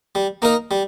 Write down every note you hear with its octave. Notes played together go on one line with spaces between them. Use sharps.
G3
A#3 D#4 A#4 D#5
G3